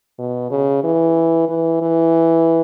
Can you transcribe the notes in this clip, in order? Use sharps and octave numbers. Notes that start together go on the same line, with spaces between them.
B2
C#3
E3
E3
E3